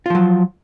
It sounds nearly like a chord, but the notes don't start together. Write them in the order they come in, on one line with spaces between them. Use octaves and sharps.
F4 F3 F#3